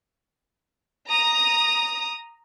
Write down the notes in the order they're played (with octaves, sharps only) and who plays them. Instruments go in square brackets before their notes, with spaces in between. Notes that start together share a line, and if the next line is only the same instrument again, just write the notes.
[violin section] A#5 D#6